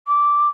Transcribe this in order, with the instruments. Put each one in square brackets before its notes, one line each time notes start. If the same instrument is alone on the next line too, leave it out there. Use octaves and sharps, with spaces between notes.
[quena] D6